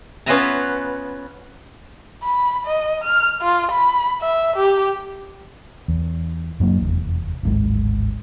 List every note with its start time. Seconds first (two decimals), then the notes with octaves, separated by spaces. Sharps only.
0.26 B3 C#4 F4 B4 E5 A#5
2.23 B5
2.66 D#5
3.04 F6
3.42 F4
3.72 B5
4.21 E5
4.57 G4
5.88 E2
6.60 F#2 F#3 A#3 D4
6.81 F1 E2
7.43 D1 G#1 G#3